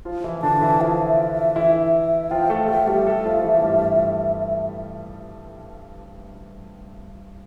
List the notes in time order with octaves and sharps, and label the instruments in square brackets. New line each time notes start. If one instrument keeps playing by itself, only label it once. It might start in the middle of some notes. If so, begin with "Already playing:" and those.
[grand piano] F3 F4
E3 E4
[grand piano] D3 D4 [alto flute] A5
[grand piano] E3 E4
[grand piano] F3 F4 [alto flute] E5
[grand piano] E3 E4
[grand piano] F3 F4 [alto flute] G5
[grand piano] A3 A4
[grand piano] A3 A4 [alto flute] G5
[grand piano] G3 G4 [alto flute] E5
[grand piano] A3 A4
F3 F4
E3 E4
A3
G2 G3
E3